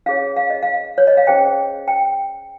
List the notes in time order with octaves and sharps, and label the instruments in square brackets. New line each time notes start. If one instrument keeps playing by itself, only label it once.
[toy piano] C#4 G#4 C#5 F5
F5
D#5
F5
C#5
D#5
F5
C#4 G#4 C5 G5
G5